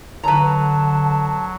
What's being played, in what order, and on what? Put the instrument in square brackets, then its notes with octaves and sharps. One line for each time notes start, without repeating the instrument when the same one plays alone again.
[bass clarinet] D3 [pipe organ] F#3 [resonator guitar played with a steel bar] B4 A#5 [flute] A5